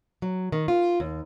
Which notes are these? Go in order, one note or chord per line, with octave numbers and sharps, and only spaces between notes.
F#3
D#3
F4
D#2